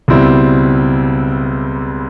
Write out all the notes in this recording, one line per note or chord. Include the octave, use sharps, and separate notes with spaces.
C#2 B2 G3 C4 E4